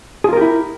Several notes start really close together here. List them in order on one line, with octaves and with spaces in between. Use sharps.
G#4 F4 A#4 G4 E4